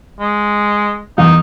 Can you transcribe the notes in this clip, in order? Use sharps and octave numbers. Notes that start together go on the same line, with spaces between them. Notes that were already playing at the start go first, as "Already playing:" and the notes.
G#3
E2 D#4